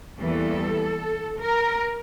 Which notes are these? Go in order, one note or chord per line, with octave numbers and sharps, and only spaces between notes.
E2 E3 G3 A#3 A4
A#4